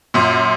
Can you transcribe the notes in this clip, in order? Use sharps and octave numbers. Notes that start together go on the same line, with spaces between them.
F#2 A#2